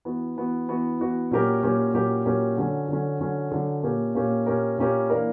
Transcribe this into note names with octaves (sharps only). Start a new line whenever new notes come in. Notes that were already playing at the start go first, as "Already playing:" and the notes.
E3 B3 F#4
E3 B3 F#4
E3 B3 F#4
E3 B3 F#4
A#2 F#3 C#4 G4 A#4
A#2 F#3 C#4 G4 A#4
A#2 F#3 C#4 G4 A#4
A#2 F#3 C#4 G4 A#4
D3 F#3 C#4
D3 F#3 C#4
D3 F#3 C#4
D3 F#3 C#4
A#2 A#3 C#4 G4 A#4
A#2 A#3 C#4 G4 A#4
A#2 A#3 C#4 G4 A#4
A#2 A#3 C#4 G4 A#4
E3 A#3 D4 A#4